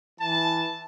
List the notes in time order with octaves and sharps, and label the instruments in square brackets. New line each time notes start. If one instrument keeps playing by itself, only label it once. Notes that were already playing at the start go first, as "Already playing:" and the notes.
[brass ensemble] E3 A5